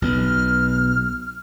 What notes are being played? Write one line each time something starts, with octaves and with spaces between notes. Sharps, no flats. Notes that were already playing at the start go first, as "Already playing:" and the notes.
B1 B2 F6